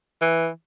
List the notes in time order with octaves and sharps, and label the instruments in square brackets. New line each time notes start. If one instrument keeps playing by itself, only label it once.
[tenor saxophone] E3